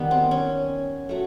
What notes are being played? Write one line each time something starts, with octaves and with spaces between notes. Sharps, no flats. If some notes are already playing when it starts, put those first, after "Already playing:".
Already playing: D#3 G3 B3
C4
C#4
F#3 A3